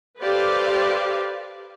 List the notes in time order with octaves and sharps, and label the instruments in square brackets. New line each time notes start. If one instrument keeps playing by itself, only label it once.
[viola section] G4 A4 B4 C5 D5 F5